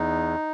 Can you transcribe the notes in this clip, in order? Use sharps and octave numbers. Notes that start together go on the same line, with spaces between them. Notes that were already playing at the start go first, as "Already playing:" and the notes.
Already playing: E2 D#4